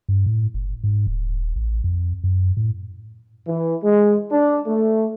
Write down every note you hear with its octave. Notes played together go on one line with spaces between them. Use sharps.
G2
A2
F#1
G#2
D#1
A1
F2
F#2
A2
E3
G#3
D4
A3